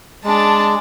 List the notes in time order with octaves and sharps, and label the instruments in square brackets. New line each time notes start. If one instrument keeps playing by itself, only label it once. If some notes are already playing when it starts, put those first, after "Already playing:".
[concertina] G#3 [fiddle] D4 A5